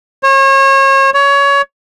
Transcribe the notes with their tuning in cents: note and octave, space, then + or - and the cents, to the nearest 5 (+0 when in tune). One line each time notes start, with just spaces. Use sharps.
C#5 -35
C#5 +20